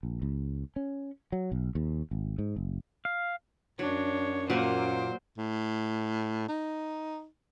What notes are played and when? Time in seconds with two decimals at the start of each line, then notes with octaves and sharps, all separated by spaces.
0.03 A#1
0.22 C#2
0.76 C#4
1.32 F#3
1.52 B1
1.75 D#2
2.11 G#1
2.38 G#2
2.56 F#1
3.05 F5
3.79 F#2 F#3 D4 C#5
4.50 A#2 F#3 A#3 C5
5.38 A2
6.48 D#4